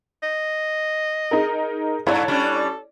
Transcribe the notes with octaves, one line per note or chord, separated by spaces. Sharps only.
D#5
D#4 G#4 A#4
G2 E4 A4 C#5 D5
G3 C#4 D4